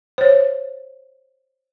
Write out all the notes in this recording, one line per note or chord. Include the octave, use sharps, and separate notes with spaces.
C5 C#5